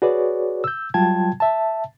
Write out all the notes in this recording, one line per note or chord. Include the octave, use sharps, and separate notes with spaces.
F#4 G#4 B4 C#5 D5
E6 G6
F#3 G3 F4 G5 A5 G#6
E5 A5